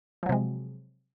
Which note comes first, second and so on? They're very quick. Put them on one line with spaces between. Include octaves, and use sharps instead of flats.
F3 F#3 C3 G#3